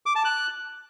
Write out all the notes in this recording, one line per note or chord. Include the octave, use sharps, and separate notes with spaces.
D6
A5
F#6